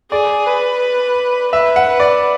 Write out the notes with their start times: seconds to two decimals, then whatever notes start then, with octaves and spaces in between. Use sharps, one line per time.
0.11 G#4 D5
0.47 B4
1.52 B4 E5
1.76 F#5
1.88 B4
2.00 D5